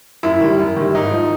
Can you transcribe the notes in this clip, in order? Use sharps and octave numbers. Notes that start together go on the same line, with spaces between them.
F#2 E4
D#3 G3
F#2
D#3 G3
G#2 D#4
F3